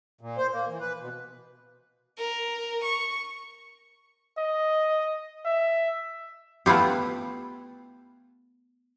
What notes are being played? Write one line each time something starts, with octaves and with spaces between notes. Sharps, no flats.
A#2
C5
A#3
E3
B4
B2
A#4
C#6
D#5
E5
A3 B3 E4 F4 G4